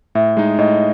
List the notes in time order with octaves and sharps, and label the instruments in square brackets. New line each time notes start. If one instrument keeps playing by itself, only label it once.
[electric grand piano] A2 [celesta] E5
[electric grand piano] G#3 D#4
[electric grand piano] A2 [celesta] D#5